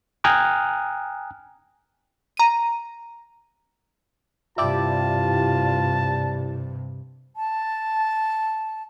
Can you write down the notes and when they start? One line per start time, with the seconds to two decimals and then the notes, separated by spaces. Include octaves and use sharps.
0.24 G5 G#5 A#5 D#6 F6 F#6
2.37 A#5 D#7
4.58 G2 C3 E4 F4 G4 D5 A5
7.36 A5